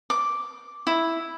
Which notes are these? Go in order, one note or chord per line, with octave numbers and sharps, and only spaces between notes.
D6
E4